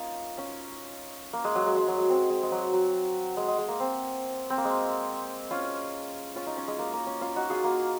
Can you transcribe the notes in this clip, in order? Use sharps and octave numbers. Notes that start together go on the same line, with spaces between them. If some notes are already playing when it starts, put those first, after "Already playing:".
Already playing: A#3 C#4 D#4 F4
C#4
A#3
G#3
F#3
G#3
G#3
F#3
G#3
C4
G#3
G#3
F#3
F#3
G#3
G#3
G#3
A#3
C4
C4
A#3
G#3
C#4 F4
C#4 F4
D#4
C#4
G#3
A#3
A#3
C#4
C#4 F4
D#4 F#4
F4 G#4
A#3